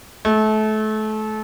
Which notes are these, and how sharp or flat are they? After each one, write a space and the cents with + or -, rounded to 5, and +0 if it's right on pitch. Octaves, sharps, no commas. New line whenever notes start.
A3 -30